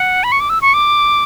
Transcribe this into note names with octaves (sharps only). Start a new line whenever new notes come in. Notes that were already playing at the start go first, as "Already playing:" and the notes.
Already playing: F#5
B5
C#6
D6
E6
C#6
D6